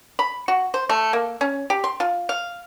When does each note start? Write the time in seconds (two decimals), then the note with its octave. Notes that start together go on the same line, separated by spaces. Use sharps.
0.19 B5
0.48 F#4
0.74 C5
0.89 A3
1.13 A#3
1.41 C#4
1.70 G4
1.84 C6
2.00 F4
2.29 F5